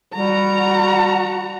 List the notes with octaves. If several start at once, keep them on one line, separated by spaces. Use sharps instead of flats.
G3 F#4 A#5